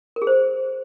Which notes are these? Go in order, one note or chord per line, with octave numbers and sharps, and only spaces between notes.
A#4
G#4
C5